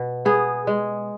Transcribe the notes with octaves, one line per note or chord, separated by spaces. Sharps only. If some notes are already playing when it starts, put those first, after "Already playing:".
Already playing: B2
B3 G#4
G#3